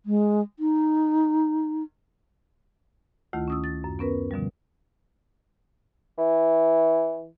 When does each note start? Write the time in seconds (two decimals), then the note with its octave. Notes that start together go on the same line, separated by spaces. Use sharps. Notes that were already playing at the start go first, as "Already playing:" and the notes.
0.06 G#3
0.59 D#4
3.33 D2 D#3 A3 E4 F4
3.48 C#4 D#6 E6
3.64 A6
3.84 F#2
3.99 B3 C#4 A#4 B4
4.31 B2 D3 F3 G3
6.18 E3